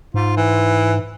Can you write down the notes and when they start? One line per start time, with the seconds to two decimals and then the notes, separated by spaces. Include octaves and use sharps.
0.14 G#2 F4
0.37 E3